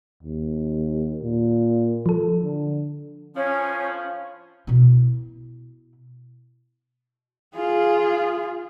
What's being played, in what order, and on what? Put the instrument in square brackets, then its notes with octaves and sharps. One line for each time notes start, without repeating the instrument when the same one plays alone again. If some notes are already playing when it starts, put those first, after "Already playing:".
[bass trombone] D#2
A#2
[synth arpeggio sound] F3 A4
[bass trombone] D3
[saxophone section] A2 F3 [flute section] C#4
[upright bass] B2 E4
[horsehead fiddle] F4 G#4